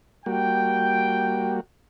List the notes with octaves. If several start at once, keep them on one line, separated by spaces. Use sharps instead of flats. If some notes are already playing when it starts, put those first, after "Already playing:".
G3 A#3 F#4 G5